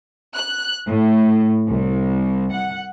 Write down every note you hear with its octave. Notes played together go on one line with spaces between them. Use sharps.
F#6
A2
C2
F#5